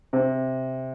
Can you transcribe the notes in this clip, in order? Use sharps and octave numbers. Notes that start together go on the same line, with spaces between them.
C3